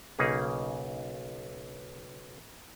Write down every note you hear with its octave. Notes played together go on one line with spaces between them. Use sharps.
B1 C#3 A#3 D#4 G#4